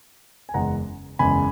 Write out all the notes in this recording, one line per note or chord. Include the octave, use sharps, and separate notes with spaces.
G#5
F#1 E2 C#3 G#3 F#5 A#5
F#1 E2 C#3 G#3 G#5 B5